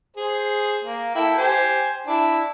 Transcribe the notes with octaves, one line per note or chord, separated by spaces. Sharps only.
G#4 C5
A#3
E4 A4 G5
G4 C5 G#5
D4 E4